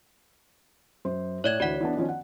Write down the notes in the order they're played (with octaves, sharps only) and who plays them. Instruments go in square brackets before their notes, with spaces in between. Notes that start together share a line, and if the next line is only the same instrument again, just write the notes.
[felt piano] F#2 C5
[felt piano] A2 [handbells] C#5 D5 G#6
[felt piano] D2 E3 [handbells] F#4 D5 F#5
[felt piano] E3 B3 D4
D#3 F3 C#4
F#5